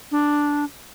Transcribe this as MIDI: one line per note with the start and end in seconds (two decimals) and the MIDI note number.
0.11 0.65 62